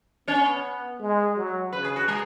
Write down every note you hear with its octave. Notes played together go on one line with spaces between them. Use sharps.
B3 C#4 C#5
G#3
F#3
C#3 B4
G#4
F#4
G#3 G#4